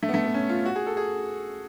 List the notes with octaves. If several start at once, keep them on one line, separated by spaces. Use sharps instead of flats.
A3
B3
A3
B3
C#4
F4
F#4
G#4
A4
G#4